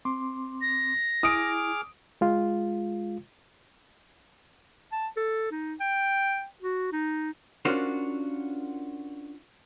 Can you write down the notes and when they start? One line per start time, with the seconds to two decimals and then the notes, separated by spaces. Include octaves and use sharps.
0.05 C4 C6 D6
0.61 A#6
1.23 E4 G#4 D6 D#6 F6 D7
2.21 G#3 F4
4.92 A5
5.17 A4
5.52 D#4
5.80 G5
6.63 F#4
6.92 D#4
7.65 C#4 D4 F4 F#4 A#4 C5